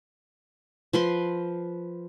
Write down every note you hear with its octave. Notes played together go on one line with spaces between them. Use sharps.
F3 B4 C6